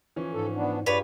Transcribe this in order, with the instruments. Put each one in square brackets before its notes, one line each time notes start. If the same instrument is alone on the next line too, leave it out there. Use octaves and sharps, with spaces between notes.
[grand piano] E3 F3 C#4
[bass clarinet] G#2 [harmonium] A4
[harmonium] B3 D4
[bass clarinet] G2 [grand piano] F4 G4 G#4 [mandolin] B4 C#5 [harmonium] D5